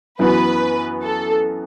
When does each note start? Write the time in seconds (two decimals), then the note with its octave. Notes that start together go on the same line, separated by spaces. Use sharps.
0.19 F#2 E3 B3 F#4 B4
1.02 A4